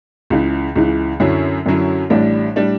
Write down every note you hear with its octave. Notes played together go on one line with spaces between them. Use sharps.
C#2 C#3 E3
C#2 C#3 E3
F#2 D3 F#3 C#4 E4
F#2 D3 F#3 C#4 E4
A1 A2 G3 D4
A2 G3 D4